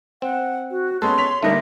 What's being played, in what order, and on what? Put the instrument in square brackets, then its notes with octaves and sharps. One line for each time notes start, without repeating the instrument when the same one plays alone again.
[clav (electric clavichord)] C4 [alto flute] F#5
[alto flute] F#4
[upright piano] G#3 B3 C#4 [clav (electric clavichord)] A4 [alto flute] C6
[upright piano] C#5 B6 F7
[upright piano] D3 G3 A#3 [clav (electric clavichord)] A3 [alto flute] D#4